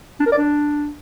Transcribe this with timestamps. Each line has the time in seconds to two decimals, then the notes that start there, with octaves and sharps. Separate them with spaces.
0.20 D4
0.26 A#4
0.32 D5
0.38 D4